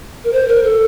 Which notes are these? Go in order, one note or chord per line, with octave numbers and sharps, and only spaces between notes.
A#4
C5
A#4
A4